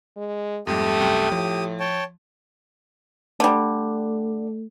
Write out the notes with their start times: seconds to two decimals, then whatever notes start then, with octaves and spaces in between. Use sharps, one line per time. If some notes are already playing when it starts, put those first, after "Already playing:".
0.17 G#3
0.67 F2 G#2 G3 A3 G4 D#6
1.01 C2 F#2 G5
1.32 A2 F3
1.80 C#5 G5 A5
3.40 D3 G3 A3